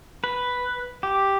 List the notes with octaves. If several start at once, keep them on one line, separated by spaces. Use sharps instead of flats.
B4
G4